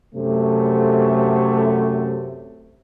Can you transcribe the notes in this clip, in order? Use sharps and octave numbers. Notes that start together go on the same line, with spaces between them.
F#2 C3 A3